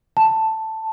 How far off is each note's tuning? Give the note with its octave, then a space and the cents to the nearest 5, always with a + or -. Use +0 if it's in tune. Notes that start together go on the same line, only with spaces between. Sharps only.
A5 +5